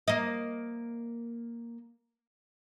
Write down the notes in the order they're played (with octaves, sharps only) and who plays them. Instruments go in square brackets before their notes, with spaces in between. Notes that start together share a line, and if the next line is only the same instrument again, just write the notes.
[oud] A#3 D#5